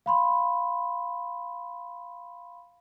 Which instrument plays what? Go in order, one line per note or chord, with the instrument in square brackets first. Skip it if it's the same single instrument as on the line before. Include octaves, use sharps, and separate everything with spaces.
[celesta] F5 B5 C6